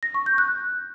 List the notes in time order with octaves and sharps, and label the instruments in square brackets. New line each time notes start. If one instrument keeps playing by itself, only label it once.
[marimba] A#6
C#6
G6
F#6